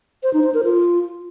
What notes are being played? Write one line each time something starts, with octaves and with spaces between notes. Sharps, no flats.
C5
D#4
C5
A#4
F4